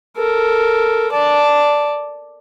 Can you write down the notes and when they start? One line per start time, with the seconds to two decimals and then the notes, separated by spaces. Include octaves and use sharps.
0.17 A4 A#4
1.12 D5 A5